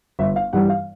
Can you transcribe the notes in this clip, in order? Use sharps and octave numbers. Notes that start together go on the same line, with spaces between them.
G1 E5
F5
G2 E3 G3 F#5
F5